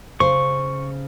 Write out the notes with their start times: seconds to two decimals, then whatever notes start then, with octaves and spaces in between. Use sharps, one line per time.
0.20 C#3 C5 C#6